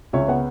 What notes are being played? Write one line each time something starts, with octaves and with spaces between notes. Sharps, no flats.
C#2 C#5 E5
B3 F#5